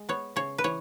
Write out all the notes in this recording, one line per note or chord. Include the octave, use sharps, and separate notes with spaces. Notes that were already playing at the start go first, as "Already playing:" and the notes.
Already playing: G#3
B3 C#5
C#3 C#5
B4
E3 C#5